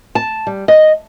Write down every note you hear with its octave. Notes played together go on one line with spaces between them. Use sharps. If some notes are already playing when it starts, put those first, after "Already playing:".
A5
G3
D#5